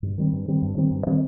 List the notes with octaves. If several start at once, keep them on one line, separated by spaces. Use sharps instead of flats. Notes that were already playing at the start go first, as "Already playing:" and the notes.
G2
D#3 G3 C4
G2
D#3 G3 C4
G2
D#3 G3 C4
G2
D#3 G3 C4